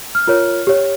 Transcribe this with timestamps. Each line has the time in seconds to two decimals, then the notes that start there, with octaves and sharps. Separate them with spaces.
0.15 F6
0.27 F4 A#4 C#5
0.67 G4 C#5